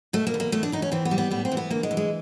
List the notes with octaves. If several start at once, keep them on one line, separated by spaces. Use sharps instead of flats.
B2 A3
A#3
E2
A#3
E2 A3
D4
E2 D#4
C#4
E3 C4
B3
G3
B3
A2 B3
C4
E3
B3
D2 A#3
G#3
E3
G#3